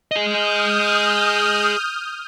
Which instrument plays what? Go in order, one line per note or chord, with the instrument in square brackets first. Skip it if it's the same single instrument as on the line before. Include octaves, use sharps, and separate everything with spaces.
[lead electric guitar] G#4 D#5 [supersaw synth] D#6 F6 G6